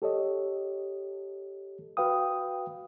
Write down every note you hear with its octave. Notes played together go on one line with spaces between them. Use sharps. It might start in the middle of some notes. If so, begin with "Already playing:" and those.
G4 A4 C#5 D#5
F#4 B4 F5 G5 D#6